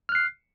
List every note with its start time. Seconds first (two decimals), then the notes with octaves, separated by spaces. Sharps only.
0.09 F6
0.12 F#6
0.15 C7